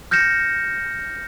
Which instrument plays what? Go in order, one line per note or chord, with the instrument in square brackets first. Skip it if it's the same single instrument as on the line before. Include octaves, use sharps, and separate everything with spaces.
[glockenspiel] F6 G6 A#6 C#7 E7